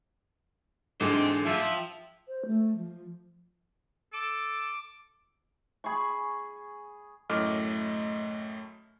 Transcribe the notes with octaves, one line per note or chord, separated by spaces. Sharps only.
G#2 D3 E3 G#3 G4 C5
F3 F4 E5 G5
C5
A3
F3
A4 D6
G#4 B5 C#6
F#2 A2 A3 D#5 D6 F6